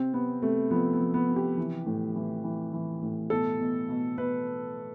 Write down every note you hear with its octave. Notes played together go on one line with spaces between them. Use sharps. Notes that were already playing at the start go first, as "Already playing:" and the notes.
Already playing: C3 C4
C3 B3
C3 A3
F3 B3
B3
F3
B3
C3
G4
E3
A2
E3
E3
E3
A2
B2 A4
B2
B2
B2 B4